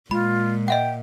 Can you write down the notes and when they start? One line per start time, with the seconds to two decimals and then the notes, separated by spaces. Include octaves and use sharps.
0.11 A#2 G#3 F4 B5
0.68 D#5 E5 F#5 G5